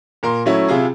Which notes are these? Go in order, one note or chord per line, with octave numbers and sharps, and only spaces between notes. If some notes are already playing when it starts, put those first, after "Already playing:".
A#2 A#4 C6
F#3 A3 C#4 E4
C3 E4 F4 G#4